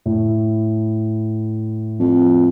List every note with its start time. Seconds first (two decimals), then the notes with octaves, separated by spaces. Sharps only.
0.06 A2
2.00 F2